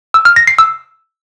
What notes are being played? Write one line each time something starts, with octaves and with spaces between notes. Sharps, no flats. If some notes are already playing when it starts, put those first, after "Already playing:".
E6
F6
A#6
C7
E6